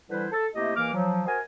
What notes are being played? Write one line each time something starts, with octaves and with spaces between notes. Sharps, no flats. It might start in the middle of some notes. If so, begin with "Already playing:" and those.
D3 E3 G3 E4 B4 C5
A4
C3 A3 A#3 E4 G4 D#5
D#2 E3 A#3 D6 F6
F3 F#3
F#4 A#4 C5 D#5 G#5